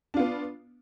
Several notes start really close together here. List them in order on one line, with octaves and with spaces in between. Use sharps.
D4 F4 B3